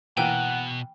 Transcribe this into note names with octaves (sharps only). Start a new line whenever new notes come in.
B2 E3 A#3 F#5 G5